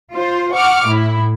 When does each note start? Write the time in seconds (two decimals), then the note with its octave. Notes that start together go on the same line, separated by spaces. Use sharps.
0.13 F4 C5
0.54 F#5 C#6 D6 F6
0.86 A2 E4